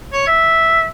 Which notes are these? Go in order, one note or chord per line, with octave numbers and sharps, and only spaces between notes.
C#5
E5